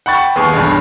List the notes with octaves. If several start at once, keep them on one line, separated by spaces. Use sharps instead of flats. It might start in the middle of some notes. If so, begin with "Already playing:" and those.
F#5 G5 B5 C#6 A6
D#2 B3 G#4 C#6
B1 E2 G2